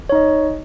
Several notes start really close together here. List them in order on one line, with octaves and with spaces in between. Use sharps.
C#5 D#4 D#5